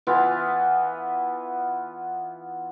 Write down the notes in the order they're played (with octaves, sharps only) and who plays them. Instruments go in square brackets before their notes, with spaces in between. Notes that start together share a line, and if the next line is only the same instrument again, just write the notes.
[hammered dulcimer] E3 B3 F4